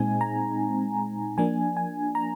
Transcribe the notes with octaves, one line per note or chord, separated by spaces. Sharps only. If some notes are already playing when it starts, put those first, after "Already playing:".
Already playing: A#2 G#3 C4 D#4 G#5
A#5
F3 A#3 D4 G#5
G#5
A#5